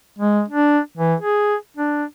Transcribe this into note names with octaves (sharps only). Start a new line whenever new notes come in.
G#3
D4
E3
G#4
D4